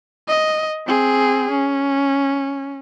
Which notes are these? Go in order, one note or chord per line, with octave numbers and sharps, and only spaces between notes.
D#5
C4 G#4
C#4